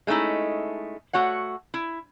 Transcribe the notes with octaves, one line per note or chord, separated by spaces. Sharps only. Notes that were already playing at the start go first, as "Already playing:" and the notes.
G#3 A3 C#4 D#4 E4
A3 F#4 C#5 F#5
E4